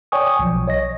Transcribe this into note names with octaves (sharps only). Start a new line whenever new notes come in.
C#5 D5 G5 G#5 C#6 D#6
B1 F3
C#5 D#5 A#6